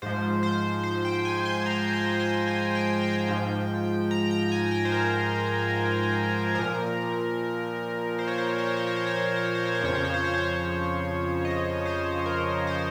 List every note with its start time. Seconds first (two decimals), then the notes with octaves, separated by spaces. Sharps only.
0.02 G#2 F3 C5
0.43 C5
0.83 C5
1.05 G5
1.25 G#5
1.45 C6
1.66 A#5
1.93 C6
2.20 C6
2.47 G#5
2.75 G5
3.02 G5
3.29 G#2 F3
4.11 A#5
4.31 A#5
4.52 G#5
4.71 G5
4.85 C5
4.92 A#4
6.55 A#2 F3 A#4
8.19 C5
8.28 C#5
8.38 C5
8.48 C#5
8.58 C5
8.67 C#5
8.76 C5
8.87 C#5
8.96 C5
9.07 C#5
9.16 C5
9.26 C#5
9.36 C5
9.46 C#5
9.55 C5
9.65 C#5
9.75 C5
9.81 F2 C#3 F3 C#5
9.95 C5
10.05 C#5
10.14 C5
10.24 C#5
10.34 C5
10.43 C#5
10.54 C5
11.45 D#5
11.86 C5
12.26 A#4
12.67 C5